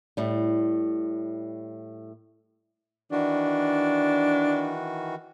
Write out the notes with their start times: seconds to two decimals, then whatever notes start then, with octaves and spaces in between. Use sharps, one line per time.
0.17 A2 G3
3.12 D#3 E3 D4 F#4